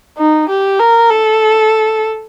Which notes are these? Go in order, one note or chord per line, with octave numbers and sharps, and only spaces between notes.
D#4
G4
A#4
A4